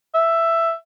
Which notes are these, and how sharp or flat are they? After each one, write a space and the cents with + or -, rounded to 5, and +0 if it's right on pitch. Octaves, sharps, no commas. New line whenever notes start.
E5 +10